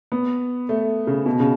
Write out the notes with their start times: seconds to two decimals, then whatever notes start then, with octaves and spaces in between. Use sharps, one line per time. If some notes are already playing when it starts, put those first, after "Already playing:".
0.12 B3
0.69 A3
1.07 C#3
1.26 B2
1.40 C#3